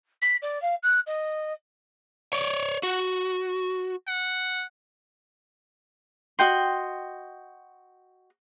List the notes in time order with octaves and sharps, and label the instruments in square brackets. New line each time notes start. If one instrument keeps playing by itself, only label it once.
[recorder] B6
D5
F5
F#6
D#5
[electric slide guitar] C#5 D5
F#4
[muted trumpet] F#5
[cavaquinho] F#4 D#5 G5 C6